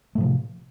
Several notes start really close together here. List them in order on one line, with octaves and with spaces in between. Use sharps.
A3 A2 F3 C3